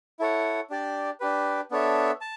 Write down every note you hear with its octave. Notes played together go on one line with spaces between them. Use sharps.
E4 A4 C#5 F#5
D4 G4 D5
D4 G4 B4
B3 D4 A4 C#5 E5
A5